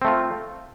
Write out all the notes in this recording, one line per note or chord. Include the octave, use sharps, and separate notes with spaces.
A3 C4 F4